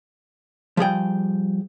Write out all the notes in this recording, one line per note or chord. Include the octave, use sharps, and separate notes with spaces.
F3 G3 G#4 G5